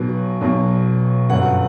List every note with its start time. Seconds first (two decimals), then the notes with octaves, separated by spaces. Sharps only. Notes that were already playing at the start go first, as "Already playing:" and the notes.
Already playing: B1 B2 F#3 B4
0.41 B1 B2 F#3
1.29 G1 F#2 F#3 F#5